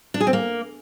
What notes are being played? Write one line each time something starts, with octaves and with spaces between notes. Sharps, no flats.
D4
G#4
C4
A#3